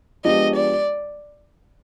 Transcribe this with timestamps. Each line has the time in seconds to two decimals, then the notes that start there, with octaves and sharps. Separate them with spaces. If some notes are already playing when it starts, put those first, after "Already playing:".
0.25 F3 G#3 B3 D4 G4 D#5
0.56 D5